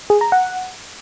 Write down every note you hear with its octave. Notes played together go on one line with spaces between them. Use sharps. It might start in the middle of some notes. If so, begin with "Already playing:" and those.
G#4
A#5
F#5